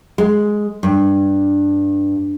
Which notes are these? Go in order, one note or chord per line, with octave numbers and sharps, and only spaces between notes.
G#3
G2